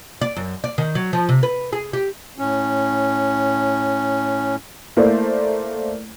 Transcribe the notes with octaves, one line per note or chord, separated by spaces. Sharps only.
D5
F#2
D5
D#3
F#3
F3
C3
B4
G#4
G4
A2 C#4
A3 A#3 E4 C5 D5